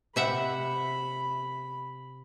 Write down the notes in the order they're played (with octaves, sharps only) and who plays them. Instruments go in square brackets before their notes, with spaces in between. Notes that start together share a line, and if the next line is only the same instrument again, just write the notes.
[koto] C3 E5 F#5 [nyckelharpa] B5